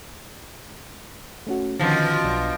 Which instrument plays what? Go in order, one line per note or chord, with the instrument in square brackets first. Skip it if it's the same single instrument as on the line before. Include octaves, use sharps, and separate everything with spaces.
[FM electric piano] A3 C#4 F#4
[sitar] B2 F3 [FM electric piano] D3 D#3 C#4
[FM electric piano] B1 D4 E6